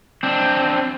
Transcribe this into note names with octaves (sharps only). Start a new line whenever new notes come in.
C4 D4